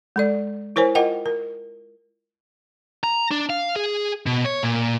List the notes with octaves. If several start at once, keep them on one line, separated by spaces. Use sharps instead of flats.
G#3 A4 D5
E4 A#4 C5 C#5 G#5
F4 A#4 D#5 F#5 G5
A#4
A#5
D4
F5
G#4
B2
C#5
A#2